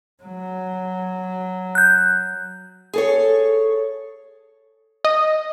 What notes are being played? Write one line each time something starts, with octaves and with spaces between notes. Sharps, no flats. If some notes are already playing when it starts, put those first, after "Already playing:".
F#3
F#6 G6
G#4 A4 C#5
D#5